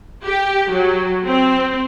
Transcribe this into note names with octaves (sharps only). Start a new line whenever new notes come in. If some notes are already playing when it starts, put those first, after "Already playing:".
G4
F#3
C4